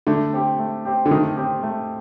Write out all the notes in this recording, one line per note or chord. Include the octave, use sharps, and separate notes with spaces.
D3 A3
C4 G4
A3
C4 G4
D3
D#3 A3
C4 G4
A3